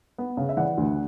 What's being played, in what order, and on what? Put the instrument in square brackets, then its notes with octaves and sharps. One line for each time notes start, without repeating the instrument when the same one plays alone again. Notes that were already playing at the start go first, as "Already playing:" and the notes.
[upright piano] B3
C#3
E5
E3 D5 F#5
D2